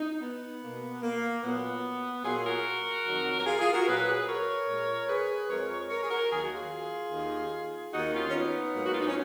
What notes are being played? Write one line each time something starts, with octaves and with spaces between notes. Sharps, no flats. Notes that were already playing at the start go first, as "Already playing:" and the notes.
Already playing: D#4
B3
B2 A#3
A#3
A#2 F#3 A#3 B3
A#2 F#3 A#3 F4 G#4
F#4 A#4
F2 D#3 F#3
A#4
F4 G#4
F4 G#4
F#4 A#4
A#2 F#3 A#3 G#4 B4
G#4 B4
A#4 C#5
A#2 G#3
G#4 B4
F2 F3 G#3 A#4 C#5
A#4 C#5
A#4 C#5
G#4
F#4 A#4
D#2 D#3 F#3 A#3 G#4
F#4
F4 G#4
D#2 D#3 A#3
D#2 D#3 A#3 D#4 F#4
C#4 F4
C#4
B3 D#4
G#2 F#3 A#3
F#4
F4
D#4
C#4